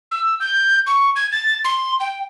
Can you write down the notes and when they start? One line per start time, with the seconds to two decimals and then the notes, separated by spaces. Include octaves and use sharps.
0.11 E6
0.40 G6
0.87 C#6
1.16 G#6
1.32 A6
1.64 C6
2.00 G5